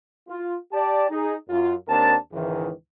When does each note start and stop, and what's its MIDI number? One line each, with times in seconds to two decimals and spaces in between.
0.29 0.55 65
0.72 1.09 67
0.72 1.09 74
0.72 1.09 81
1.10 1.34 63
1.10 1.34 68
1.49 1.74 42
1.49 1.74 65
1.88 2.15 39
1.88 2.15 60
1.88 2.15 62
1.88 2.15 70
1.88 2.15 81
2.33 2.70 37
2.33 2.70 44
2.33 2.70 51
2.33 2.70 52